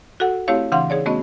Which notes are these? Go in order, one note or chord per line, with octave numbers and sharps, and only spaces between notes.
F#4 A4 F#5
A3 C4 E4 G4 C#5 F5
C#3 E3 D4 F5 F#5 C6
D#4 G#4 C#5 D5
A3 B3 C#4 F#4 D#5